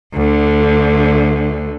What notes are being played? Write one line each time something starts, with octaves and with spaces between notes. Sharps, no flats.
D2 D3